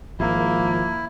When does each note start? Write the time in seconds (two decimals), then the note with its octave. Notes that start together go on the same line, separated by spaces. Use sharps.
0.20 G#1 F3 A#3 E4